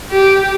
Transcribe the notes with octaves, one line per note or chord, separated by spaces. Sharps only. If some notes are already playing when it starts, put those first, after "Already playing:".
G4